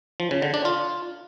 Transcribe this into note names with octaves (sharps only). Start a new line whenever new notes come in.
F3
C#3
D3
D4
F4